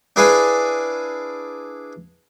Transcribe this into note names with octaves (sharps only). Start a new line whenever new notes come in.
D4 E4 G#4 B4 F5 G#5